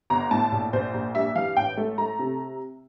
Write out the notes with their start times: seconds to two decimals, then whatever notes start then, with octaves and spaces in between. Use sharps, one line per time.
0.10 G1 A#5
0.31 A2 A5
0.52 A#1
0.73 A#1 C5
0.94 A#1
1.14 G2 E5
1.36 E3 F5
1.57 A1 G5
1.77 A3
1.98 A3 A#5
2.19 C3